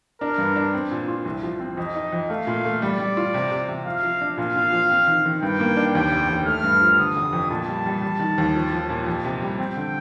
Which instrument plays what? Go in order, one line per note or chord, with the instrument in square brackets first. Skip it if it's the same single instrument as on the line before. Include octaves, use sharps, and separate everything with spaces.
[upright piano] D4 [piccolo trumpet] A#4
[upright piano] G2
D4
C4
A#2
F4
C2
F3
C4
[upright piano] F2 [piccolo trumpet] D#5
[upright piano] D#4
F2
[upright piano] A3 [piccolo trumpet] F5
[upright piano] A#2
A3
[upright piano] G3 [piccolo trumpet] D5
[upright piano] G3
F4
C3
C3
C3
[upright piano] F3 [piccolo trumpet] F5
[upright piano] F3
D4
[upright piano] A#2 [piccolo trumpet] F5
[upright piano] A#2
F3
C4
D#3
D#3
[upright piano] G2 [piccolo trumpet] G5
[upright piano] A#3
D4
[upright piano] D#2 [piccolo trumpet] G5
[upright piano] F1
D#2
[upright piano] A3 [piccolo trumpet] F6
[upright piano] G2
F3
[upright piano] D3 [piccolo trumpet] D#6
[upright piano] F1
F2
[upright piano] A#2 [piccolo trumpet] A5
[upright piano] G3
G3
G3
D#3
D#2
F3
F3
A#2
F2
C3
G3
[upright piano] C4 [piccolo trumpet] G5
[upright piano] D3